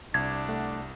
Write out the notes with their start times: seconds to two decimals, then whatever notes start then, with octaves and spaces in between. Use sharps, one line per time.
0.14 C2 D4 G#6
0.49 A3 F#5